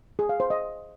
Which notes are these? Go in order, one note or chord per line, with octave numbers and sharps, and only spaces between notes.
G#4
F5
C5
D#5